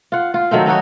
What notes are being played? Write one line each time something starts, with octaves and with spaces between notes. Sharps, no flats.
F4 F#5
F4
D#3 F#3 A3 C4
C#4 D#4 F#4 C#5